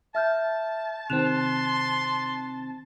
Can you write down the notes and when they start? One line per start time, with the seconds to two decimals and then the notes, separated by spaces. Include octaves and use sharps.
0.15 E5 A5 F6 G6
1.10 C3 D#3 C4 C6 F#6 E7 F7